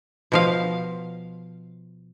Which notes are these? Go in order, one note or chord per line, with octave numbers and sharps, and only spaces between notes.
B2 F3 F5